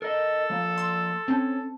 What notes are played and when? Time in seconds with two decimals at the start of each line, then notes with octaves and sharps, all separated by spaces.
0.02 A4 A#4 D#5
0.50 F3 A#3
0.78 C6 E6
1.28 C4 C#4 A5